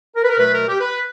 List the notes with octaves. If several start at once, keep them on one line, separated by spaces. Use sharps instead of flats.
A#4
B4
A#4
B2 F#3 A3 B4
A#4
G4
B4